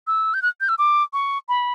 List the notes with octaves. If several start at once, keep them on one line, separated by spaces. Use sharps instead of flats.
E6
G6
F#6
G6
E6
D6
C#6
B5